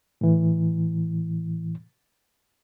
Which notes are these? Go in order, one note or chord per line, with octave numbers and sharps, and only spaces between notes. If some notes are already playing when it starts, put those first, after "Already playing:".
A2 E3